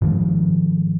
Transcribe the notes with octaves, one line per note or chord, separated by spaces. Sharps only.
G#2 D#3 F3 G3